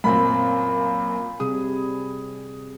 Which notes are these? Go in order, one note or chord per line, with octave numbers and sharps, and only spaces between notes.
F#2 A#2 C4 B5
C3 G3 G#4 D#6